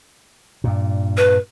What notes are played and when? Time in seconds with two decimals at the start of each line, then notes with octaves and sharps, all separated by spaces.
0.64 G2 A#2
1.17 B4